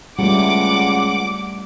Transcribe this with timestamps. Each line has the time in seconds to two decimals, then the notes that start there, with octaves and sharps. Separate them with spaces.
0.19 C#2 G3 A3 F#5 D6